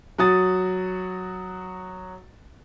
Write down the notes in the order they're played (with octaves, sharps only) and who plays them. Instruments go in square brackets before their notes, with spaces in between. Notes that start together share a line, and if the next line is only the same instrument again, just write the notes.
[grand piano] F#3 F#4 D#6 A6